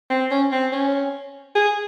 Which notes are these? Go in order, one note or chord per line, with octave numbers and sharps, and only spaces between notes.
C4
C#4
C4
C#4
G#4